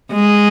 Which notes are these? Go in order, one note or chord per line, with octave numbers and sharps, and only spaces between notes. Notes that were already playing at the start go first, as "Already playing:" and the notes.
G#3